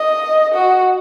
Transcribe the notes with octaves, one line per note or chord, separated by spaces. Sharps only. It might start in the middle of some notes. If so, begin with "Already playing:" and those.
Already playing: D#5
F#4